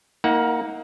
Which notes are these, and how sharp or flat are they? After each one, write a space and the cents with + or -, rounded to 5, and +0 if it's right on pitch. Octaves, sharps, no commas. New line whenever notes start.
A#3 +0 D#4 +35 F#5 +0